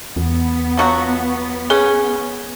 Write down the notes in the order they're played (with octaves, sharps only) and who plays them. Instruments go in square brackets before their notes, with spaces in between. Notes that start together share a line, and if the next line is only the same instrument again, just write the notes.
[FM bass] E2 [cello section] B3
[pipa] F3 F#3 F#4
[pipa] C#4 [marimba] G#4